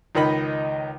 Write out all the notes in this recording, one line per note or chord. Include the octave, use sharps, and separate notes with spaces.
C#2 D#3 D#4 D#5 B5